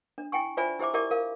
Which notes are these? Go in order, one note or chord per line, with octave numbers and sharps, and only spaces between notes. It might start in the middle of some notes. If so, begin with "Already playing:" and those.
D4
E4 G5 G#5 C#6
F4 C5 D5 E5 G#5 B5
E4 G4 C5 E5 D6
E4 G4 A#4 D5 E5 D6
A#4 F5